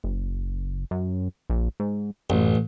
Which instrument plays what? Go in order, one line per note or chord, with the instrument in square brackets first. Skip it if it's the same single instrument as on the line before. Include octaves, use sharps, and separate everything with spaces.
[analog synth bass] F#1
F#2
A#1
G#2
[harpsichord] A1 [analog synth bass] F#2